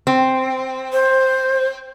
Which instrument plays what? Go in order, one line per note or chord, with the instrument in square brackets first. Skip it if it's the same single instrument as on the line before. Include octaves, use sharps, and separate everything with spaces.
[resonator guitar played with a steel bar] C4
[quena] C5